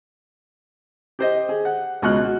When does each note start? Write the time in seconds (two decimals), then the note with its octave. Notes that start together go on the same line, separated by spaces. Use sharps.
1.19 G4 C5 D#5
1.49 G#4
1.65 F#5
2.02 C#2 B2 D#5 C#6 F6 F#6
2.25 F#4